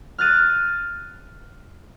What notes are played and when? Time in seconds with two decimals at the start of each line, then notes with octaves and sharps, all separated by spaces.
0.18 F6 F#6 A6 D#7